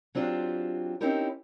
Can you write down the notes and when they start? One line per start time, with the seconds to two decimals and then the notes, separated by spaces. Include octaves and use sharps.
0.15 F#3 C4 D4 F4 G4
1.01 C4 C#4 D#4 E4 G4 A#4